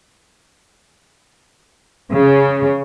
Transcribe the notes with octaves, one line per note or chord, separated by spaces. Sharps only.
C#3